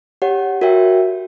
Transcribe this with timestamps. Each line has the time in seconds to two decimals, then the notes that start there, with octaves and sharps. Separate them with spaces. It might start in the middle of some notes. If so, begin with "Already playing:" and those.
0.22 G4 C#5 F#5
0.61 F#4 A#4 C#5 E5 G5